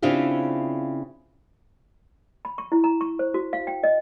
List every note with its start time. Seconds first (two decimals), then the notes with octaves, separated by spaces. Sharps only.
0.02 C#3 C4 D4 E4 F4 G4
2.45 B5
2.58 C#6
2.72 E4
2.84 A#5
3.01 C#6
3.19 C5
3.34 F#4
3.53 F5
3.67 G5
3.83 D#5